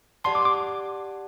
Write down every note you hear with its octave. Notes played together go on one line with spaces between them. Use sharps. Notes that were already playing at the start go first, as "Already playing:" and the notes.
G4 D5 F#5 A5 C6
D6
D6